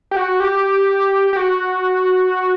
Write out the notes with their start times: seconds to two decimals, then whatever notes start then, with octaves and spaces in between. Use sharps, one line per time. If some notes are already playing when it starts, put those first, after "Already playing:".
0.11 G4
0.16 F#4
0.40 G4
1.33 G4
1.37 F#4